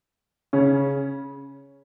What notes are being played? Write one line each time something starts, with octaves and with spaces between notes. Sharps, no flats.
C#3 C#4